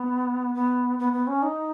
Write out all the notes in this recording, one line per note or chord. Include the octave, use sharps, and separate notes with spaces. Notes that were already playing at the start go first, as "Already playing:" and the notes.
Already playing: B3
B3
B3
B3
C#4
D#4